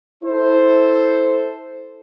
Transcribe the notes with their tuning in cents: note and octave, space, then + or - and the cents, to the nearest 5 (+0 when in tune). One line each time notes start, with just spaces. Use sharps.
E4 -20 A4 +0 C5 +0